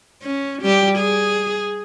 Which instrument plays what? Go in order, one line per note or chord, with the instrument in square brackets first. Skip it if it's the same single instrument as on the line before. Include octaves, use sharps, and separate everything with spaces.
[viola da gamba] C#4
G3 G4
G#4